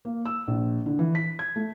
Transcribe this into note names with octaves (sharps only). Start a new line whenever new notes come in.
A#3
E6
A#1
D3
E3
B6
G#6
A3